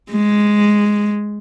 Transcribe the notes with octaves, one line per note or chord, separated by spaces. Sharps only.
G#3